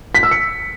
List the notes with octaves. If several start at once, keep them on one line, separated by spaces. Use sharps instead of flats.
B6
E6
C#7